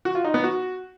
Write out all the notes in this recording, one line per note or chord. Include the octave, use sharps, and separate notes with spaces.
F#4
F4
D#4
B3
F#4